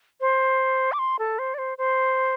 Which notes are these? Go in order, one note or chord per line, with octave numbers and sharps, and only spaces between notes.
C5
D6
C6
A4
C5
D5
C5
C5